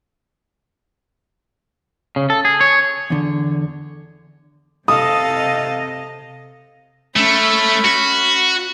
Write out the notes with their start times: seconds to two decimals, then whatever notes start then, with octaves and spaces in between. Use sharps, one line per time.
2.16 C#3
2.30 A4
2.45 G#4
2.61 C#5
3.10 E2 D3
4.88 C3 A4 D#5 F5 D#6
7.16 A3 C#4 B5
7.85 F#4